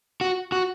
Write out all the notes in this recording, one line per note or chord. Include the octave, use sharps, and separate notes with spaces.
F#4
F#4